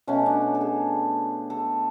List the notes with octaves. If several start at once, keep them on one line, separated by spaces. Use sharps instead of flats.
B2 A3 C#4
D4
A4
G#4
A4